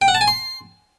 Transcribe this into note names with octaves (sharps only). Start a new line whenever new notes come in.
G5
F#5
A5
G#5
C6